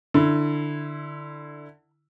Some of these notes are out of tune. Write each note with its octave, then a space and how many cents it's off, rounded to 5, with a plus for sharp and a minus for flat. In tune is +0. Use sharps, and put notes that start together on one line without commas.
D3 +15 E4 +0